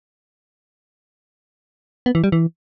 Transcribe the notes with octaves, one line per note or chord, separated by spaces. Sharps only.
B3
E3
G3
E3